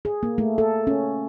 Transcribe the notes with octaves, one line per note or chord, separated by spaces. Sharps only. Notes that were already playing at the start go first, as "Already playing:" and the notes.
G#4
A#3
A3
A4
C#4